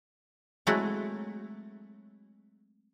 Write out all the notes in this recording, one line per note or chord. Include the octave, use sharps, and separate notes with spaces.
F#3 G#3 A3 C4 E4 F#4